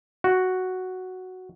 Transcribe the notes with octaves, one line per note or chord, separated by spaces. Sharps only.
F#4